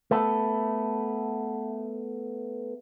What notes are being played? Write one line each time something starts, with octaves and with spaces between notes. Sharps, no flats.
A3 B3 A4